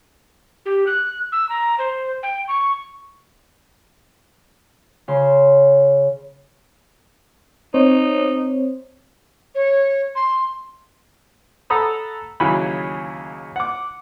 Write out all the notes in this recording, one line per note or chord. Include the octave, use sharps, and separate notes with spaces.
G4
F#6
E6
A#5
C5
G5
C#6
C#3 C6
C4 D#4 C5 C#5
C#5
C6
A4 F#5 A#5 B5 D#6 E6
D#2 C#3 E3 F#3 G#5 B5
F#5 D6